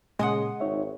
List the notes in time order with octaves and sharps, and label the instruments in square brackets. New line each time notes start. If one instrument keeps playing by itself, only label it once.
[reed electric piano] A#2 [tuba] C#3 [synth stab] G#3 [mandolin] F#5 C6 D#6
[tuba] G#1 [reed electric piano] D#4 C#5 E5